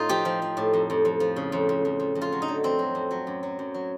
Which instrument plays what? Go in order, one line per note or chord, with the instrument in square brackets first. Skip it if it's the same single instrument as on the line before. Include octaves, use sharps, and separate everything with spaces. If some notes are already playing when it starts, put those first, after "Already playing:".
Already playing: [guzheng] A2 D#4 F4
F3 G4
F3
F3
A2
F2
F2
F2
F3
C#3
F2
F2
F2
F2
F2
F4
F#3
D#4
D3
F2 C4
F#3
F2
F#3
F#2
F#3
F#2
F#3